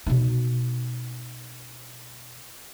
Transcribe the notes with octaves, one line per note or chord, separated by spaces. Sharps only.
B2 D#4